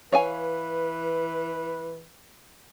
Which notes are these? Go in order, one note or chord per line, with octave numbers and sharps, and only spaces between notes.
E3 B4 C#5 F5 G#5